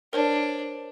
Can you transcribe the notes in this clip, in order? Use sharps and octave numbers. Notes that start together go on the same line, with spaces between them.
D4 A#4 C5 C#5